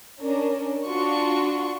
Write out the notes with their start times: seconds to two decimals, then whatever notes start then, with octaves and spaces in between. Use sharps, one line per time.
0.22 C#4 D4 A#4
0.86 D4 F4 F#4 C#6